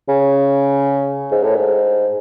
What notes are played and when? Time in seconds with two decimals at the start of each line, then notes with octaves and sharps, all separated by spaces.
0.09 C#3
1.32 G#2
1.44 A2
1.56 G#2